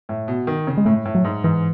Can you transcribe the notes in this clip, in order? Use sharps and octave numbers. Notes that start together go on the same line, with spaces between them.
A2
B2
D#3
C#3
G#3
A2 A3
A2
F#3
G#2
G#2 E3